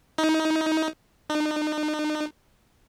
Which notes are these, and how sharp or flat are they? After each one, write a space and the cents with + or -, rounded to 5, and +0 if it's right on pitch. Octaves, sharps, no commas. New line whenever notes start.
D#4 +25
D#4 -40